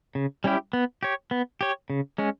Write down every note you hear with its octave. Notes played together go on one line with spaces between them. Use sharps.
C#3
G3 C#4 E4 G4
B3
G4 C#5
B3
G4 C#5
C#3
G#3 C#4